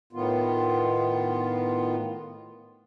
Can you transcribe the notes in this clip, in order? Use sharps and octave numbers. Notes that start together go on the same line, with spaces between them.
A2 D#3 B3 F4